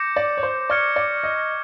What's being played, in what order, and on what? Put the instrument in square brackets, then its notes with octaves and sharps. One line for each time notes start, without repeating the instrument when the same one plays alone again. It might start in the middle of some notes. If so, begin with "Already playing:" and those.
Already playing: [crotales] D6 G6 A#6 C#7
[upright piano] D5
C#5
C5
[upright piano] D5 [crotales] C#6 F6 G#6 C#7
[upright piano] D5
D#5